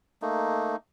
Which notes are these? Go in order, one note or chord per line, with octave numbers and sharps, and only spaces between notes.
A3 A#3 D#4